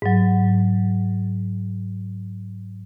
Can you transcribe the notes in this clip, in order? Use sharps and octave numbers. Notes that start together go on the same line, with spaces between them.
G#2 F#3